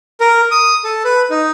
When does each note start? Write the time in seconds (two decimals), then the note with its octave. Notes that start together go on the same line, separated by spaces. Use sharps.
0.20 A#4
0.51 D#6
0.84 A4
1.04 B4
1.30 D#4